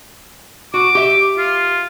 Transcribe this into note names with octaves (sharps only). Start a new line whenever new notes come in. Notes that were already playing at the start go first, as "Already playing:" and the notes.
F#4 D6
G4 E5
F4